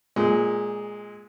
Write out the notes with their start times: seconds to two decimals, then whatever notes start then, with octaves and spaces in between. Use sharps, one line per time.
0.16 A#2 G#3